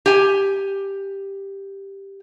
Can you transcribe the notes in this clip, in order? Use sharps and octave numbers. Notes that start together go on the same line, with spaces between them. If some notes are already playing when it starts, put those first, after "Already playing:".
G4 G#5